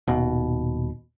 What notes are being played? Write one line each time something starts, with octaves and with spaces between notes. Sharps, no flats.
D#1 B2